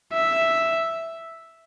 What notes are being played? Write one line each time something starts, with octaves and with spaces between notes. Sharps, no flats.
E5